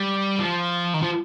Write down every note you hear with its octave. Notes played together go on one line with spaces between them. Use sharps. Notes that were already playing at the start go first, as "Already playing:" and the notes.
Already playing: G3
F3
D#3
F3